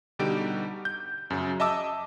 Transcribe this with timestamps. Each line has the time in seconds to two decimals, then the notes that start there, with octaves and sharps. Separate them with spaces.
0.19 B2 D3 G3 D#4 G4 D7
0.85 G6
1.30 F#2 C#3 F#3
1.60 D#5 E5 A5 D6 E6